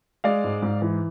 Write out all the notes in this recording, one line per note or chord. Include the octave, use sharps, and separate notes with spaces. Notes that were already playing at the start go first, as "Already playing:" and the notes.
G#3 D5 F5
G#2
G#2
E3